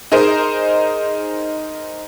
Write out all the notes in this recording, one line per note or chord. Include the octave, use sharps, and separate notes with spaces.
D#4 G#4 A#4 C5 D#5